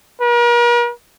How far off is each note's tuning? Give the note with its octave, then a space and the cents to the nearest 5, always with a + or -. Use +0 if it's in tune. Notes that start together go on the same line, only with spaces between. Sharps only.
A#4 +45